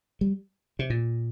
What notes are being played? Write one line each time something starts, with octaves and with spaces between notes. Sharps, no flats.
G3
C3
A#2